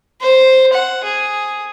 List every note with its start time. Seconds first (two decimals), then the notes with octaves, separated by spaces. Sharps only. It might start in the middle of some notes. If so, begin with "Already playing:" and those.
0.21 C5
0.74 F#5
1.04 G#4